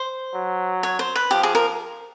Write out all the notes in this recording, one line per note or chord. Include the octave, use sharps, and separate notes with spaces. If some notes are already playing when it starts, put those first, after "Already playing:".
Already playing: C5
F#3
C#5
C5
B4
F3 G4
G#4
A#4